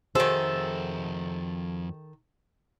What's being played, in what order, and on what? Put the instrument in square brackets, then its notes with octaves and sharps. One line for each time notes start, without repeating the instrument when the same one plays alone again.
[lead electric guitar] F2 E5 [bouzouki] D#3 A4 [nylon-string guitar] F#4 G#4 C5